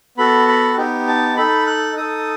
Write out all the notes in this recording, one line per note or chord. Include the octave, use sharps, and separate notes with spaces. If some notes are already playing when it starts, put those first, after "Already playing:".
B3 F#4 A4 B5
B5
B3 D#4 G4
A5
D#4 A4 B5
F#6
D#4 A4 D#6